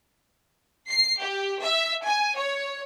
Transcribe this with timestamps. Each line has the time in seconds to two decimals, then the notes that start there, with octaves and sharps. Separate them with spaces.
0.89 C7
1.20 G4
1.61 E5
2.05 G#5
2.36 C#5